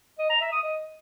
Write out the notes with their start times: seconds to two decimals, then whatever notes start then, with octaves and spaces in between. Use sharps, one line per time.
0.19 D#5
0.30 A#5
0.41 E5
0.52 D#6
0.63 D#5